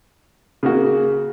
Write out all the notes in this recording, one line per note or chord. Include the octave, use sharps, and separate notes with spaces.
C#3 A#3 F#4